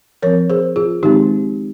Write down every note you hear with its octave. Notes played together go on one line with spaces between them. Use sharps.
F3 C4 A#4 C#5
G#4 C5
F4 G#4
D#3 G#3 C4 D#4 G4